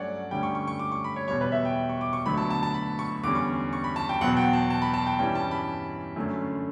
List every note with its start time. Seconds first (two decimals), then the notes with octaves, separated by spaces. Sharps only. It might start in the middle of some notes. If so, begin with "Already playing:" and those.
Already playing: G2 F#3 A3 C#4 C#5 D5 F#5
0.31 D2 D3 G3 C#4 G5
0.43 C#6
0.55 C#6
0.67 C#6
0.79 D6
0.92 C#6
1.04 B5
1.16 C#5
1.28 E2 B2 G3 C#5
1.41 B4
1.52 E5
1.65 G5
1.89 C#6
2.01 D6
2.13 C#6
2.26 D2 D3 F#3 B3 B5
2.37 A5
2.50 A5
2.63 A5
2.74 B5
2.99 C#6
3.24 E2 D3 G3 C#4 D6
3.35 C#6
3.73 C#6
3.84 B5
3.96 A5
4.09 G5
4.21 E2 B2 F#3 B3 F#5
4.37 G5
4.53 A5
4.70 A5
4.82 B5
4.94 A5
5.06 G5
5.19 G2 E3 G3 C#4 G5
5.35 A5
5.51 B5
6.16 F#2 D3 A3 C#4